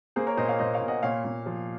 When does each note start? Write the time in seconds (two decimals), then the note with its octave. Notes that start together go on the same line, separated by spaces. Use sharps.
0.16 A#3 G#4 C5
0.27 A#4 C#5
0.37 A#2 C5 D#5
0.49 C#5 F5
0.59 A#2 C5 D#5
0.74 C#5 F5
0.81 A#2
0.88 D#5 F#5
1.03 A#2 C#5 F5
1.24 A#2
1.46 F3